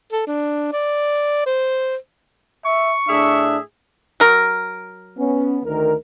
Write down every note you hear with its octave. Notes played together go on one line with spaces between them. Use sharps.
A4
D4
D5
C5
E5 C#6
A2 D4 G#4 E5
F#3 A#4
B3 C#4
D2 D#3 A#4